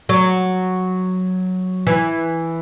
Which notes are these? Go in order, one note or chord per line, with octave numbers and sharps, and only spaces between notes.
F#3
E3